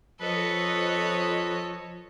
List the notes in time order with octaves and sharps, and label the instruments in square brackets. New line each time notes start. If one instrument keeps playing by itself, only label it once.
[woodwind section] F2 D#5 [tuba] F3 [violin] A4 C#5 [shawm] B4